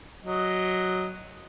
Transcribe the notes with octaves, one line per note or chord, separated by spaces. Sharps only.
F#3 D#5